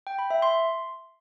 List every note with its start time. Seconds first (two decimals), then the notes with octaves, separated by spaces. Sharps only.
0.07 G5
0.19 B5
0.30 E5
0.42 C6